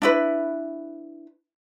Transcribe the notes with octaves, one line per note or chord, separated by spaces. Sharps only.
D4 E4 B4